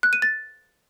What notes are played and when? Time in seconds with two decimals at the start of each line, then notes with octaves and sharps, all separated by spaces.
0.03 F#6
0.13 D#7
0.22 A6